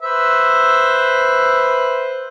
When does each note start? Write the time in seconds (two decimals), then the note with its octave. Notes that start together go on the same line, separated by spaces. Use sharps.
0.02 B4 C5 E5